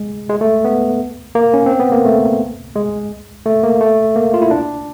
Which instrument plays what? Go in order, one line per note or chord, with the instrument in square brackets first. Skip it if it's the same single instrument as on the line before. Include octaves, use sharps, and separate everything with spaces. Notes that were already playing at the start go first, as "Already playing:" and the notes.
Already playing: [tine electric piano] G#3
G#3
A3
B3
A#3
C#4
C4
B3
A#3
A3
G#3
A3
A#3
A3
A#3
F4
E4
D4